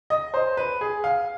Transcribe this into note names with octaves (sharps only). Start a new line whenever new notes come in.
D#5
C5
B4
G#4
F5